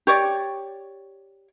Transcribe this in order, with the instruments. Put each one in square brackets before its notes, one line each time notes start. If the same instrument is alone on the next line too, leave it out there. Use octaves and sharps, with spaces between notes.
[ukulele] G4 C#5 D5